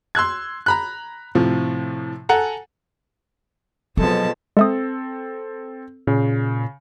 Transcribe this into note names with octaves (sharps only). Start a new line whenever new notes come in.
C6 E6 F#6 G#6
A#5 B5 F#6
A2 C3 F3
A4 F#5 G#5 A#5
B2 F3 F#3 G#3 C4 A4 A5
G#3 C4 A4 E5 D#6
A#2 C#3